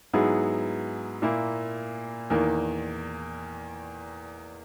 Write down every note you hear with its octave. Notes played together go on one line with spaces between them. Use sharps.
G#2 F#3 B3 E4 G#4
A#2 A#3 E4
E2 D#3 A#3